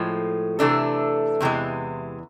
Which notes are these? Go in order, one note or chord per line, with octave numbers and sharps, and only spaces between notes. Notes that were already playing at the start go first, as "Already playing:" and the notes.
Already playing: A2 F3 G#3
C3 E3 A3 D4 A4
E2 C3 E3 G#3